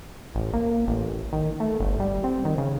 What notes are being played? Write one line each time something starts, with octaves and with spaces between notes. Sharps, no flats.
A1
A#3
A1
D#3
A3
G1
G3
C4
D#3
C#3